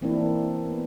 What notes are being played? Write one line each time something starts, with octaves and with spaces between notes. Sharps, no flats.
E3 A#3 C4 D4 E4
B3